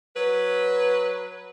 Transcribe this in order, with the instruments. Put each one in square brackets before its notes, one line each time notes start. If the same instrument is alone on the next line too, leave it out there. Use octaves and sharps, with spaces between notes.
[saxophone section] F#3 B4